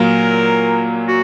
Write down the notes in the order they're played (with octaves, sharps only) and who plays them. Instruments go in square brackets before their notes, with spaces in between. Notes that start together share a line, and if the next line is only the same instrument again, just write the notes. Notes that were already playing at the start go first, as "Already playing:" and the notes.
Already playing: [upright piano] A#2 F#3 A#3 [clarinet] A#4
[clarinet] F#4